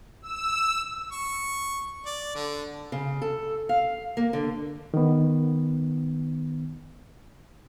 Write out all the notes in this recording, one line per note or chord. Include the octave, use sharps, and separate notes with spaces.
E6
C#6
D5
D3
C#3
A4
F5
A#3
D3
D#3 B3